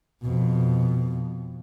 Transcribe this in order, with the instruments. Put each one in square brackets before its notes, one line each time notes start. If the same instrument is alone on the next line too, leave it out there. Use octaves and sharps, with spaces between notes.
[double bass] F2 B2